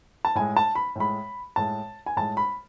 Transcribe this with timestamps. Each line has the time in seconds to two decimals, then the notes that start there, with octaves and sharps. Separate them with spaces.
0.25 A5
0.35 A2 G#3 G#5
0.57 A5
0.75 B5
0.96 A2 G#3 B5
1.56 A2 G#3 A5
2.06 G#5
2.17 A2 G#3 A5
2.37 B5